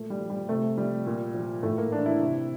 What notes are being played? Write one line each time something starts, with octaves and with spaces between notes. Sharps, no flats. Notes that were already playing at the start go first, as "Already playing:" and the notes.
Already playing: A#2 A3
G3
F3
G3
C3 A3
F3 G3
A#2
F3
A2 A3
A#3
E3 D4
E4
C3